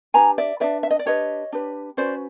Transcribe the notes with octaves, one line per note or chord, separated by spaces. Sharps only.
D4 G4 B4 G#5 A#5
D5 E5
D4 G4 B4 D5 E5
E5
D#5
D5
D4 G4 B4 C#5 D#5
D4 G4 B4
C#4 F#4 B4 C5 D5